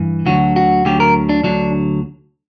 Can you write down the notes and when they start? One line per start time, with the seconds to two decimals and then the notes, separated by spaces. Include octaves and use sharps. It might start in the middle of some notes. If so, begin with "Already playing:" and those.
Already playing: G2 E3
0.26 D2 D3 F#3 F#4
0.56 F#4
0.85 D2 D3 F#3 G4
1.00 A#4
1.29 D4
1.44 D2 D3 F#3 D4